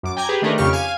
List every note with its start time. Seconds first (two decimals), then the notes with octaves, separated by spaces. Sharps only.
0.03 F#2 D6
0.16 G5 G#5 A#5 D6 G#6
0.29 G4 G#4 B4
0.42 D#3 A3 D4 D#4 A#4 B4
0.58 F2 C#3 G4 C#6 F6
0.73 F5 G#5 D#7